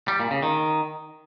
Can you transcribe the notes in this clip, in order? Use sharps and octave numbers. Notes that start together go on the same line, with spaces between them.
G3
A#2
C#3
D#3